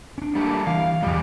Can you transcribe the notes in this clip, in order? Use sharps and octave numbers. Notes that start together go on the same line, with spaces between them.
C#4 D4
G3 A3 A#3
E3 F5
E2 E3 F3 G3 G#3 G4